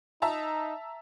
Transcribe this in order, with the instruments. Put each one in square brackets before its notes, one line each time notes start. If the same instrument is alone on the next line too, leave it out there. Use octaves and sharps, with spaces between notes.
[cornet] D#4 [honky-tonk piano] E5 A5 A#5